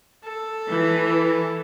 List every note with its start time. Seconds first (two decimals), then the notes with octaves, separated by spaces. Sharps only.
0.25 A4
0.68 E3